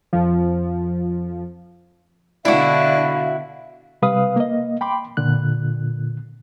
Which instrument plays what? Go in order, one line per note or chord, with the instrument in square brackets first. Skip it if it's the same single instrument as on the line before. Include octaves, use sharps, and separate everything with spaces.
[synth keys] F2 F3
[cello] B2 D3 [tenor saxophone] D4 [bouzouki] E4 F#4 [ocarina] F5
[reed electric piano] C3 G3 B4 F5 D#6
A#3 D#5
G5 B5 C6 D6
A#2 D3 F#6